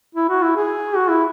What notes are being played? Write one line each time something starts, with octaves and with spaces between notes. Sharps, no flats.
E4
F#4
E4
G#4
F#4
E4